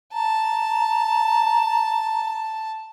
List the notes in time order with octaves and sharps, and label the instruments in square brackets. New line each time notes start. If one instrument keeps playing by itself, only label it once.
[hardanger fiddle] A5 [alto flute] A#5